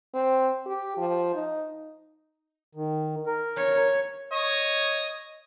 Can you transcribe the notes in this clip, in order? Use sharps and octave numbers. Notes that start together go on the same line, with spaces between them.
C4
G4
F3
D#4
D#3
A#4
C#5
C#5 D#5